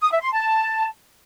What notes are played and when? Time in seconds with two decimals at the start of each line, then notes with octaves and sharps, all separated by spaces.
0.01 D#6
0.11 E5
0.22 C6
0.32 A5